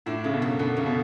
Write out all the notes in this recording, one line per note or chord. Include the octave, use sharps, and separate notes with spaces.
A2 D4
C#3 A3
B2
F#2
B2 D3
F#2 C#3
B2